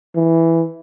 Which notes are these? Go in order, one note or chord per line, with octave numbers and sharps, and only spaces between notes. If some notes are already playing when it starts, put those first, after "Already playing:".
E3